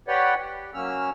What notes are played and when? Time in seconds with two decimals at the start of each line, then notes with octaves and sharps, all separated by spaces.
0.08 G4 B4 C#5 D5 F#5 G5
0.41 G4
0.74 F#3 A#3 C#4 E6 F6